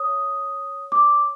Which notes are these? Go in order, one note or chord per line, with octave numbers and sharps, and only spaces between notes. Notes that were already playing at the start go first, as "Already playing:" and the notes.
Already playing: C#5 D#6
D6